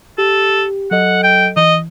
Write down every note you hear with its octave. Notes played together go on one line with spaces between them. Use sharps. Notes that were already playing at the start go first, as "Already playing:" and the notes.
G4 A4
F#3 A4 D#5 F#5
G5
E3 D#5